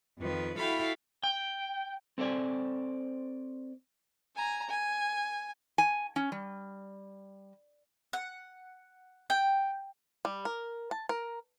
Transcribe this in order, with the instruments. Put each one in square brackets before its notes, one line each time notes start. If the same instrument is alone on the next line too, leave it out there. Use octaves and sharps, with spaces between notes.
[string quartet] F2 D#3 F3 B4
E4 F#4 A4 F5 G5 B5
[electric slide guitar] G5
[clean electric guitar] C4 A4 C5 D5 G#5
[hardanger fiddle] G#5 A#5
G#5
[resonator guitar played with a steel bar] G#5
C#4
G3
[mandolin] F#5
G5
[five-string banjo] G3
A#4
A5
A#4